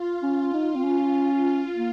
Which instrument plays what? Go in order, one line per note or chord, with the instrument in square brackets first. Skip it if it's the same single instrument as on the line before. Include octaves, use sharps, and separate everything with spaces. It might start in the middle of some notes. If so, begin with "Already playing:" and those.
Already playing: [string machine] F4
[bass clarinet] C#4
D#4
C4
C#4
A#3